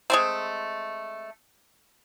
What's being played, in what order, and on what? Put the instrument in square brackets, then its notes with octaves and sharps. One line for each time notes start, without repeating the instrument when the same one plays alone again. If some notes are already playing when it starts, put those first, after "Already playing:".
[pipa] G#3 A3 C4